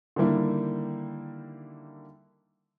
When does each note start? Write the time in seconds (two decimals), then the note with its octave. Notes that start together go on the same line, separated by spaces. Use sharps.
0.16 D3 D#3 G3 A#3 E4